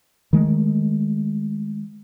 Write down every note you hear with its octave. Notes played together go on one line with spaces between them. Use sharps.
D#3 G#3 A3